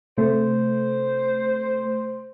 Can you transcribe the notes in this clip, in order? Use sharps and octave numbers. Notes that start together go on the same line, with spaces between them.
C3 A3 C5